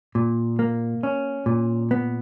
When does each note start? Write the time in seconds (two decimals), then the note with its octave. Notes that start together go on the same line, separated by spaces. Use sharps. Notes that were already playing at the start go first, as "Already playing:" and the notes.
0.15 A#2
0.59 A#3
1.03 C#4
1.46 A#2
1.91 B3